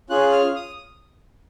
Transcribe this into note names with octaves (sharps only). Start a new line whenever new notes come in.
C#4 F4 G#4 F#6
F6
D#6